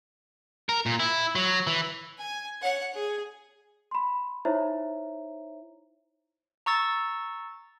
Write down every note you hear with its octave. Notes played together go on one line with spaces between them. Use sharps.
A#4
A#2
E4
F#3
E3
G#5
C#5 F#5
G#4
B5 C6
D#4 E4 C5 C#5 E5 A#5
A#5 C#6 E6 A6